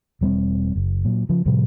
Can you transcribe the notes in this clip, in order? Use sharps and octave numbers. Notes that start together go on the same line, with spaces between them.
E1 G3 B3 C4
F#1
A#2 F#3
C#3 F3
A2 C3 F3 G3